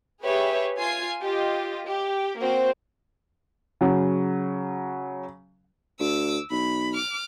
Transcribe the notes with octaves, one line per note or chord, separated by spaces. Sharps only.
G4 G#4 B4 C#5 E5
F4 G#5 G#6 C7
F4 G4 D#5
G4
A#3 C4 F#4 C5
C#3 F#3
D2 D6 E6
B1 B5
D6 F6